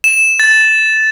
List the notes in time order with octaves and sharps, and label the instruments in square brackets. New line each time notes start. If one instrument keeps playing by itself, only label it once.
[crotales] E7
A6